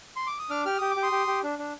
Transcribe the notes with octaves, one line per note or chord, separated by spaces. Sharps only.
C6
D6
D#6
D4 D6 F6
G4 F6
G4 D#6
D6
G4
C6 D#6
G4
G4
D4
D4